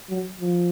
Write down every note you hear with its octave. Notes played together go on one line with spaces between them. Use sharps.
F#3
F3